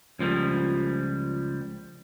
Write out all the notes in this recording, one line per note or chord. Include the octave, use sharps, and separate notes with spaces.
C#2 F3 G3 A#3